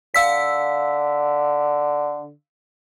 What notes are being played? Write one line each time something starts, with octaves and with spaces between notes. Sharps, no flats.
D3 F5 E6 B6